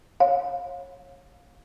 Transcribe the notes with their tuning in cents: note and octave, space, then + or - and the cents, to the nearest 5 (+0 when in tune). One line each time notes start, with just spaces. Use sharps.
C#5 -25 F5 +20